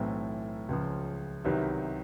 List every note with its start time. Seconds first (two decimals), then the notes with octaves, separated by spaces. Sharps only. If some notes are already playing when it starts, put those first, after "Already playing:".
Already playing: B1 A2 E3 A3 C4
0.69 C#2 C#3 F3
1.44 C2 C3 D#3 F#3 B3